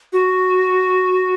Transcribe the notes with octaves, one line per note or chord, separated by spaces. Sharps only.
F#4